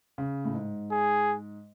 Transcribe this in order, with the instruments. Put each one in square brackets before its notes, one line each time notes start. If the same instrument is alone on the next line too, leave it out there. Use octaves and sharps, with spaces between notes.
[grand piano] C#3
A2
G#2
[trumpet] G#4